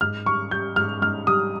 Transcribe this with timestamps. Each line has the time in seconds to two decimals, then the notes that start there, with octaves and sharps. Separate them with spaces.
0.01 G#2 F6
0.26 G3 C#6
0.51 G3 G6
0.76 G#2 F6
1.02 G#2 F6
1.27 G3 D#6